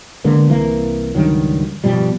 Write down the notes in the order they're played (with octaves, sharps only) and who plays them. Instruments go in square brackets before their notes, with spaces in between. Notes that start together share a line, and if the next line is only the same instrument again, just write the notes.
[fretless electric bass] D3 G#3 A#3 B3
C2 E3 A#3
C#2 G2 D#3 F#3
G2 B2 F3 G3